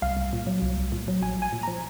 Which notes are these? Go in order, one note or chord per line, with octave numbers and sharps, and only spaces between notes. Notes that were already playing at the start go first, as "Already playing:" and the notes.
C2 F5
C2
A#2
F#3
C2
C2
A#2
F#3
A#1 G#5
A#1
G#5
A#2
F3 A#5